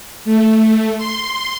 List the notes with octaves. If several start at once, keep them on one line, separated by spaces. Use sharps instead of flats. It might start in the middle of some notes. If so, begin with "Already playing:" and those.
A3
C6